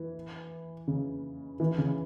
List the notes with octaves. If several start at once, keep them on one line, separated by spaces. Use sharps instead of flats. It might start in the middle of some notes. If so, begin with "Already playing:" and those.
Already playing: E3
C#3
E3
C#3